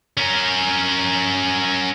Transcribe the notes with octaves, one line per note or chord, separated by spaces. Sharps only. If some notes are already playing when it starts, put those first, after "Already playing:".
C#4 A#4